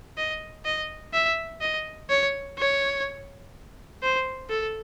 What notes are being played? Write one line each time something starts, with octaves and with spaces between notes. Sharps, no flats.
D#5
D#5
E5
D#5
C#5
C#5
C5
A4